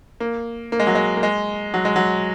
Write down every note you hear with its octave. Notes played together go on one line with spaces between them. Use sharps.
A#3
A#3
G#3
F#3
G#3
A#3
G#3
F#3
G#3
F#3